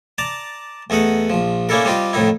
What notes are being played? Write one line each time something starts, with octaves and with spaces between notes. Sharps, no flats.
D5 A5 A#5
E2 A3 D#4 D#5 F#5
A#1 F3
A#3 C#4 D4 E4 A4 A#4
G3 C4 F4 G4 D#5
F2 A2 D#3 D#4 E4